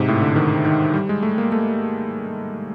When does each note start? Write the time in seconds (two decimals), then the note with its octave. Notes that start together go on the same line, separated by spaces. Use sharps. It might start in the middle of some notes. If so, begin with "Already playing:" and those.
Already playing: G#2 C3
0.08 A2
0.22 D3
0.36 D#3
0.65 D#3
0.94 G3
1.09 G#3
1.23 A3
1.38 A#3
1.52 A3